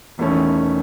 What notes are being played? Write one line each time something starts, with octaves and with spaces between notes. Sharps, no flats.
E1 E2 D#3 A3 C#4